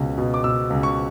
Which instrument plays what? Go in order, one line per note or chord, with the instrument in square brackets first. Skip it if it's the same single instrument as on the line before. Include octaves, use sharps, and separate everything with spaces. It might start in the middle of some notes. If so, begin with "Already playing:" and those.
Already playing: [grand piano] C#2 B2
B2
D6
B2 E6
C#2
C#6